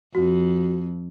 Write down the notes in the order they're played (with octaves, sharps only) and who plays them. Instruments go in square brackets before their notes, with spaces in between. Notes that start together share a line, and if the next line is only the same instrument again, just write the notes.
[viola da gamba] F2 [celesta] F#4